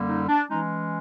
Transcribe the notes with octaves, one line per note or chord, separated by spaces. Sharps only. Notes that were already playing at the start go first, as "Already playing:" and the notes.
Already playing: F#2 D3 G3 A#3
D#4
D4
E3 G#3 C#4 D#4